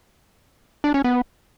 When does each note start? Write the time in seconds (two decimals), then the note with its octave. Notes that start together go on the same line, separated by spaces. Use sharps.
0.84 D4
0.94 C#4
1.04 B3